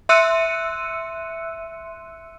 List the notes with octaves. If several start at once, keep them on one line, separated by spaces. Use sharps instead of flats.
E5 C6 E6 F#6 C#7 D#7